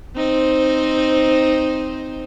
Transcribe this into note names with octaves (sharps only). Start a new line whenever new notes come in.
C4 D#4 C5